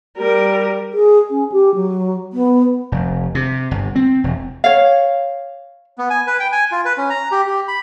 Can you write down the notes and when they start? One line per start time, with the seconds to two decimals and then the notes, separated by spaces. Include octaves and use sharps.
0.18 G3 A#4
0.93 G#4
1.30 C#4
1.52 G4
1.75 F#3
2.33 B3
2.92 F1
3.35 C3
3.71 G1
3.95 C4
4.24 E1
4.64 C#5 F5
5.97 B3
6.10 G#5
6.27 B4
6.40 G5
6.52 G#5
6.72 F4
6.85 B4
6.97 C#4
7.10 A#5
7.32 G4
7.47 G4
7.68 B5